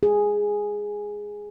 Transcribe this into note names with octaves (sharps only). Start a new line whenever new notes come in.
G#4